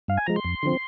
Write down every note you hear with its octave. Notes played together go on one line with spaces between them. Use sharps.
G2 F5
G#5
F3 G#3 A#5
C6
F2
D3 F3 C4